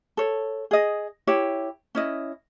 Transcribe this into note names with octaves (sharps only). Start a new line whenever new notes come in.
A4 C#5
G#4 D#5
E4 G4 C#5
C#4 E4 D#5